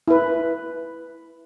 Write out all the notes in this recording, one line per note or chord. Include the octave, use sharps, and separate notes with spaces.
E4 B4